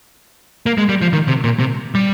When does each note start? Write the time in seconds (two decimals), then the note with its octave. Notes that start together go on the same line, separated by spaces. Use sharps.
0.66 A#3
0.78 G#3
0.89 G3
1.02 F3
1.13 D#3
1.28 C3
1.44 A#2
1.60 C3
1.95 G3